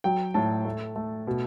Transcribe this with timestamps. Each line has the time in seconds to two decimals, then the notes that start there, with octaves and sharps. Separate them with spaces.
0.04 F#3 G5
0.34 A2 A5
0.65 A3
0.96 A3
1.27 B2